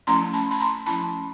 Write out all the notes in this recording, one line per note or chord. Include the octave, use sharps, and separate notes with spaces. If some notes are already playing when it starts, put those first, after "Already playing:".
F3 A3 C#4 E4 A#5 C6
A5 B5
B5
A#5 C6
F3 A3 C#4 E4 A5 B5